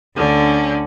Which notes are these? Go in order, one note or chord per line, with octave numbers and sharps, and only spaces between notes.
D2 D3 C#4